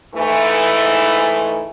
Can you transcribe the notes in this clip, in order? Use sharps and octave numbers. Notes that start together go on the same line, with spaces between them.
G#2 E3 A3